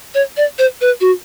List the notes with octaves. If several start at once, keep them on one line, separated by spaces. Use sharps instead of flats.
C#5
D5
C5
B4
F#4